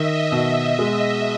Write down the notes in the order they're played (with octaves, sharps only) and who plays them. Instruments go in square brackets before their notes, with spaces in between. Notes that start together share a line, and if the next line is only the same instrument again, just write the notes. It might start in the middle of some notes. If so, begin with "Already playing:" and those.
Already playing: [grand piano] D#3 [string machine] D#5 E5
[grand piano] B2 [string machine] D#5
[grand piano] G#3